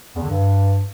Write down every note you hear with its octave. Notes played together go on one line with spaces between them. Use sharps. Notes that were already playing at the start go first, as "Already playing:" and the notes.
E2
D3
G2